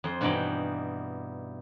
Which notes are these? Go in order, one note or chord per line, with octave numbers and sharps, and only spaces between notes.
F2 C5
G2 B2 E3 D#4 D5 G5